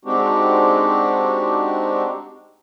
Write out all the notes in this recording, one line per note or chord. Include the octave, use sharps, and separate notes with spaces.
G#3 C4 D4 D#4 F#4 G4